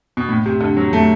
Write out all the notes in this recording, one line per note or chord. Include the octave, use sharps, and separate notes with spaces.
B2
A2
C3
D3
F#3
A3